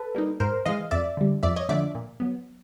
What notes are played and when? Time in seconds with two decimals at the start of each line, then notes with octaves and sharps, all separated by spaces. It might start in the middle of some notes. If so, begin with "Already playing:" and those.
Already playing: A4 B4
0.15 G3 A#3 D#4
0.40 G#2 A#4 C5
0.66 E3 G#3 D#5 F5
0.91 F2 D5 E5
1.17 D3 G3
1.43 F2 D5 E5
1.56 C#5 D#5
1.69 D3 F3 A3 D4 D5 E5
1.95 A#2
2.20 F#3 B3